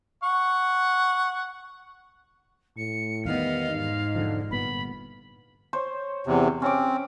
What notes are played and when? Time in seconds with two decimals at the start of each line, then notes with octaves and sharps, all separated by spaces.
0.23 F#5 C#6
2.77 A2 C#7
3.25 E2 D#3 G3 B3 D#5 F5
3.70 G#2 D#4
4.15 E1 D3 F3
4.51 G1 A#2 B3 B5
5.73 C5 C#5
6.27 E2 C3
6.62 C4 C#4 D6